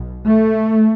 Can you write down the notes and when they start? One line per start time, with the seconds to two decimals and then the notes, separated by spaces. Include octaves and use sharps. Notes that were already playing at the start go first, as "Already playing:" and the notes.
Already playing: B1 B2
0.26 A3